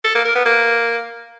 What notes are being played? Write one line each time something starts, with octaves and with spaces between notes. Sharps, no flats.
A4
A#3
A#4
B3
A#3